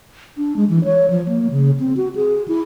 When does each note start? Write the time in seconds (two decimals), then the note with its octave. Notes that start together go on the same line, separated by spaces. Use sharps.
0.37 D4
0.56 G#3
0.69 E3
0.84 C#5
1.10 F3
1.28 A#3
1.51 C#3
1.80 C4
1.97 F#4
2.16 G#4
2.48 E4